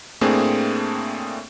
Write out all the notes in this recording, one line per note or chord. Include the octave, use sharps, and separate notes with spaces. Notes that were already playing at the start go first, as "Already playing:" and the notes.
A2 A3 A#3 C4 D4 G#4